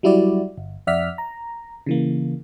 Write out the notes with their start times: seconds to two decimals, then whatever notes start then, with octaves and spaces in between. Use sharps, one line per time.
0.03 F#3 G3 E4 F#4 D5
0.58 G1
0.87 F2 D5 E5 F#5 F6 B6
1.18 A#5
1.86 C#3 E3 A#3